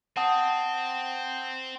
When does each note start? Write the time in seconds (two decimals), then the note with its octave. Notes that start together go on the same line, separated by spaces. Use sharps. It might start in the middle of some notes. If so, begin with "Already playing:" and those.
0.17 C4 F#5 A5 D#6